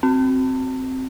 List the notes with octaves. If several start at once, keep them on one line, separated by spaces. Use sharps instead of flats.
C4